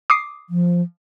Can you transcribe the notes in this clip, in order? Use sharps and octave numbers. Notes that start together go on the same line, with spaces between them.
D6 D#6 C7
F3